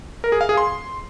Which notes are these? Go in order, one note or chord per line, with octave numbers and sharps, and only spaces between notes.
A#4
G#4
F5
G#4
C6